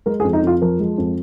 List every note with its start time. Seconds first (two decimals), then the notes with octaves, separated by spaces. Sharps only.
0.06 G#3 A#4
0.20 G#4
0.24 F2
0.33 D#4
0.42 F2 F4
0.62 F3 A#4
0.80 G#3
0.98 F2